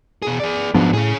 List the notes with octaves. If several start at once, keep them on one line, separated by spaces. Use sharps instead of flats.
B2 G#4
G#4 D5
G#2 F3 F#3 B3 D4
A2 C#4 G#4